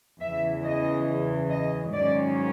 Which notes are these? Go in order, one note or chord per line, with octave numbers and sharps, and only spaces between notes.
E2 C#3 E3 E5
D#5
D#5
G#2 D#3 F#3 A#3 C#4 D5